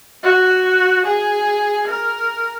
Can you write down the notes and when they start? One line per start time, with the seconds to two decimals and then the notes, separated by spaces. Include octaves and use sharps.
0.23 F#4
1.05 G#4
1.87 A#4